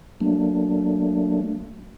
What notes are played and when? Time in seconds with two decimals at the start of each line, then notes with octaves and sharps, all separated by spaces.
0.20 F#3 A3 A#3 D4